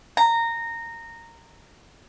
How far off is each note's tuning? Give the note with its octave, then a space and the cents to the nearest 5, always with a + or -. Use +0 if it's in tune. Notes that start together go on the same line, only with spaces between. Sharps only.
A#5 -15